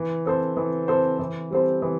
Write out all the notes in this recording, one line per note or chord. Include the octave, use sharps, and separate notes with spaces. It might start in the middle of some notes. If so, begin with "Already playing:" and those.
Already playing: E3
C4 A4 C5
E3
C4 A4 C5
E3
G3 C4 A4 C5
E3